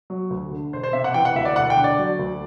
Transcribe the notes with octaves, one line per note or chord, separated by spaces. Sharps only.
F#3
D2
D3
E1 C5
C5
C3 E5
F#5
E3 G5
F#5
D2 E5
D5
E1 F#5
G5
D3
D5
F#3
D2